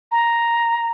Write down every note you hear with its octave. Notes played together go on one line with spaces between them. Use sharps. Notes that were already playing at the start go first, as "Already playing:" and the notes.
A#5